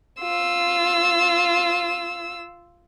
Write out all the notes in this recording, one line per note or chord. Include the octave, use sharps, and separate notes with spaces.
F4 E6